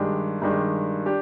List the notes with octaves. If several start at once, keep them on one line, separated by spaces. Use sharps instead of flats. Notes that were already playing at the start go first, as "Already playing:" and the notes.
Already playing: G2 D#3 G#3 D4 G4
G2 D#3 G#3 D4 G4
D4 G4